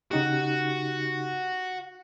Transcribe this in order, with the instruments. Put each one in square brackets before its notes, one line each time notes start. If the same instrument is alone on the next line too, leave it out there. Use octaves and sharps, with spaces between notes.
[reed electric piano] C#3 D#4 G4 [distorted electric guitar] F#4